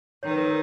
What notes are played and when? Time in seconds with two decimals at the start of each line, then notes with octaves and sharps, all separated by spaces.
0.23 D#3 C#5
0.31 B4
0.38 A#4
0.47 B4